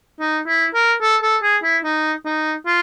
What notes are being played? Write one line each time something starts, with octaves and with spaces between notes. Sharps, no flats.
D#4
E4
A#4
A4
A4
G#4
E4
D#4
D#4
F4